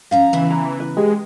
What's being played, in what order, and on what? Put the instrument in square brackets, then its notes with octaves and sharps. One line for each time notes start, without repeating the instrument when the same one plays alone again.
[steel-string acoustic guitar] F3 C#4 A#5 [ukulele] F5
[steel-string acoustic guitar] C#3 B3 E4 [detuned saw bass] E3
[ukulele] A#5
B4
[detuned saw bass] G#3 [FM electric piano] G4 G#4 D#5